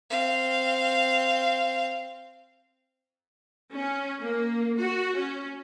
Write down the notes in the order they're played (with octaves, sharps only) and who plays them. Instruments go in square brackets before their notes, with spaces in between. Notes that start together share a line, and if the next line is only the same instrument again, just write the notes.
[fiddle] C4 F5
[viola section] C#4
A#3
F#4
C#4